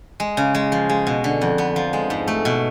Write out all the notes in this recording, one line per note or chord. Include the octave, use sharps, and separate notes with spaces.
G#3
C#3
G#3
F3
G#3
B2
D3
F2
B3
F3
G#3
G#2
A3
B2